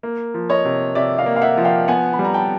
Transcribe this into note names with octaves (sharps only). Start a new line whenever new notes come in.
A#3
F3
C#5 D#5
C3
C3 D5 E5
D#5 F5
A#3
F5
E5 F#5
F3
F5 G5
B3 F#5 G#5
B5
G3
A#5
G5 A5